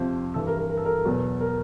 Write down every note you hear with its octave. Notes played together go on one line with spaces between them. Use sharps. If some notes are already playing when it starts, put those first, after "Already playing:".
Already playing: F2 C3 F3 C5
G2 E3 A4
A#4
A#4
A#4
A4
A#4
E2 B2 F#3
A#4